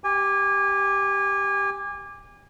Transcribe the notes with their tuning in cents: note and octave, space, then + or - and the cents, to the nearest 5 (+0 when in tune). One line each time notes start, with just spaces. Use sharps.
G4 +0 G#5 -30